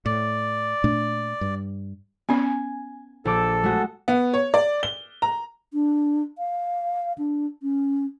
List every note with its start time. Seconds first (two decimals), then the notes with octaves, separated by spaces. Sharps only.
0.06 A2 D5
0.84 A#2 A3 D4
1.41 G2
2.29 B3 C#4 G#5
3.25 A#1 A4 D6 E6
3.63 G#3 A3 F#4
4.08 B3
4.34 C#5
4.54 D5
4.83 G7
5.22 A#5
5.73 D4
6.38 F5
7.18 D4
7.63 C#4